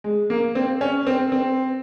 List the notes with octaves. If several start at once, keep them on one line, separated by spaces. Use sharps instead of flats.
G#3
A#3
C4
C#4
C4
C4